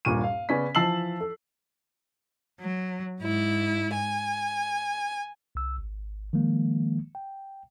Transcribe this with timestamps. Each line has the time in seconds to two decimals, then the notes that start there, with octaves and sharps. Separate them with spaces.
0.05 D#1 G2 A#2 C#6 D#7
0.23 F5
0.49 C#3 B3 C#4 D5 B6
0.75 E3 F3 A5 E6 C7 F#7
1.20 A4
2.60 F#3
3.20 G#2 E4
3.94 G#5
5.55 C2 E6
5.78 G#1
6.33 D#3 F3 G#3 A#3
7.15 G5